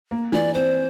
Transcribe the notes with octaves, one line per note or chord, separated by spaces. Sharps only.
A#3
E3 D5
C4 C5